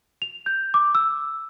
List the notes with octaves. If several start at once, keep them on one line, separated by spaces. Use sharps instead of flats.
F7
G6
D6
E6